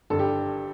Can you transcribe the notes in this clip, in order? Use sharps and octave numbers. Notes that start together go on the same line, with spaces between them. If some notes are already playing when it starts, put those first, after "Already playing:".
G1 G2 G3 A4
G4